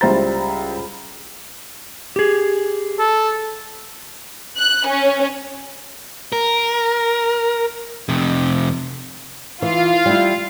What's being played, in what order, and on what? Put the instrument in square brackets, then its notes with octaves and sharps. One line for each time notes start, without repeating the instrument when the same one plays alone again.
[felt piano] C#2 G3 E4 C5 A#5 A6
[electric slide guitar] G4 G#4
[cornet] A4
[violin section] F#6
C#4
[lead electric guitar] A#4
F2 C3
[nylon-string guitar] E3 [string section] F4 F5
[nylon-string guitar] G3 E4